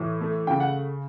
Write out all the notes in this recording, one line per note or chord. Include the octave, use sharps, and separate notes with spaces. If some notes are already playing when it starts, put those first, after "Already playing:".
Already playing: A2 E3
A3
C#3 G5
F#5